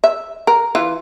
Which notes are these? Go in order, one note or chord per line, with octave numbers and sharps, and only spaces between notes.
E5
A#4
E3 F4